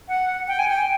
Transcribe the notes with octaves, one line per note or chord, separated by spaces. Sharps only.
F#5
G5
G#5
G5